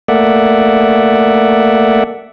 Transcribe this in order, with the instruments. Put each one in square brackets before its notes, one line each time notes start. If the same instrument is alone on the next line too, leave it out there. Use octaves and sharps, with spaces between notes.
[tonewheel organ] A3 A#3 D5 E5 F#5